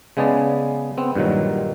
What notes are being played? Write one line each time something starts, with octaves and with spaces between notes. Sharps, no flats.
C#3 G#3 B3 G#4 D5 A5
B3 C4
G2 A#2 D#3 F#3